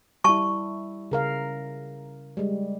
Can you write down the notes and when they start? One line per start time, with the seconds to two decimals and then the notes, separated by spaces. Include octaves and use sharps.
0.24 G3 E4 A5 C#6
1.11 C#3 A#4 F5
2.37 G3 G#3